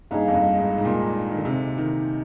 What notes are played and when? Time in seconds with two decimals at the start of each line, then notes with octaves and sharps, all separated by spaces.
0.11 G2 A#3 D#4 G#4
0.28 F2
0.34 G2
0.56 G#2
0.78 G#2
0.85 A#2
0.92 G#2
1.30 D#3
1.38 D3
1.45 C3
1.78 D#3